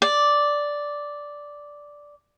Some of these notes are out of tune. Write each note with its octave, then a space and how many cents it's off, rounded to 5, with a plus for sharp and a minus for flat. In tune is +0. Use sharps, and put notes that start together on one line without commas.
D5 -5